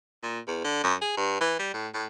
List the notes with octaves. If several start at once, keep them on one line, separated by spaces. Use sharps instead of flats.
A#2
E2
D3
F#2
G#4
G2
E3
G3
A2
A2